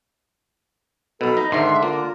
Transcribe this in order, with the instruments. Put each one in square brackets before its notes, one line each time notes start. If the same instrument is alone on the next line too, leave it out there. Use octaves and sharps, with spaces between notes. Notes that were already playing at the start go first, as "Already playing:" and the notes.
[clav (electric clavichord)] B1 B2 [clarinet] A4 [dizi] B5
[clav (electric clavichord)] D#4 [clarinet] A#5
[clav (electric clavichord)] G#2 D#3 [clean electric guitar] D3 [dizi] E5 [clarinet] C6
[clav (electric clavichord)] A#3 [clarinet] F4 [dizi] A#4